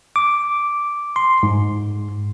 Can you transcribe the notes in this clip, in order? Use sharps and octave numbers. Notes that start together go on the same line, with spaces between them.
D6
C6
G#2